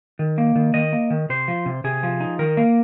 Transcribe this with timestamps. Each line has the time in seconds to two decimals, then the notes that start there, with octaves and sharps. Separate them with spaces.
0.19 D#3
0.38 A#3
0.56 D#3
0.74 D#3 D#5
0.93 A#3
1.10 D#3
1.29 C3 C5
1.48 F3
1.66 C3
1.84 C3 G#4
2.03 F3
2.20 D#4
2.39 D#3 A#4
2.57 A#3